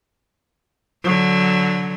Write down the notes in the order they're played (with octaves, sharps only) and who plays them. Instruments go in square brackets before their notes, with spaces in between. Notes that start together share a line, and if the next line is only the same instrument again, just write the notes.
[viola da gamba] D3 F#3